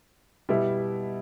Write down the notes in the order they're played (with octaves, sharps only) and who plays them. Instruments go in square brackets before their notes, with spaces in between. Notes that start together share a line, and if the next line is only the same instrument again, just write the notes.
[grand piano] B2 G3 B3 E4